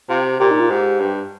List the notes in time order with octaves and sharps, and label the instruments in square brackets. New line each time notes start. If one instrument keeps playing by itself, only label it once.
[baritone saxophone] C3 [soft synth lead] F4
[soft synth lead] G4
[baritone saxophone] A#2 [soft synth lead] G4
[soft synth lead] D#4
F4
[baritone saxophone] G#2 [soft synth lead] G4
[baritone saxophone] G2